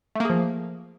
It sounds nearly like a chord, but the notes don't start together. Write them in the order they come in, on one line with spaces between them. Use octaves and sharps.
A3 A#3 G#4 F3